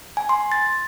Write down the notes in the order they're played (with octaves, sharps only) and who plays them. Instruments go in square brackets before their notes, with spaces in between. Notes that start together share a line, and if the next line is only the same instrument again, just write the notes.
[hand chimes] G#5
C6
A6